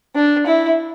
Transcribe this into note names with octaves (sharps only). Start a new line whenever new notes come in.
D4
E4